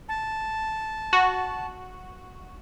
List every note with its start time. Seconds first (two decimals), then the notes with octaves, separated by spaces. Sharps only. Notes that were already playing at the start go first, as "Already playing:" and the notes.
0.09 A5
1.13 F#4